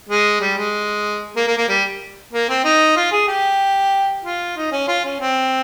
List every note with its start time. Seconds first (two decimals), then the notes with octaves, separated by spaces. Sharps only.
0.09 G#3
0.41 G3
0.57 G#3
1.36 A#3
1.47 A#3
1.57 A#3
1.69 G3
2.33 A#3
2.49 C4
2.64 D#4
2.96 F4
3.12 G#4
3.28 G4
4.24 F4
4.57 D#4
4.72 C#4
4.88 F4
5.04 C#4
5.20 C4